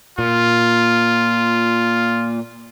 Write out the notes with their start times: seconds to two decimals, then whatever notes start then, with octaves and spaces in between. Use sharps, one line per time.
0.19 A#2 F4